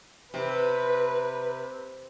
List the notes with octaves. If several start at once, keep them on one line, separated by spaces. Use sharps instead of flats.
C3 B4